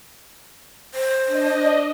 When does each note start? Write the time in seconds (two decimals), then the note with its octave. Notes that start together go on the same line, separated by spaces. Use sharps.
0.94 C5
1.26 D4 D#5